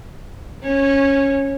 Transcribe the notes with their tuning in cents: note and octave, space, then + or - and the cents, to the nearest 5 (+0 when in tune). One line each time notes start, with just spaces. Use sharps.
C#4 +0 C#5 -20